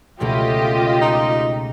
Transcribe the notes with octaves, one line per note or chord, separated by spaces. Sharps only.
C#2 B2 A3 F4 G4 D#5
D#4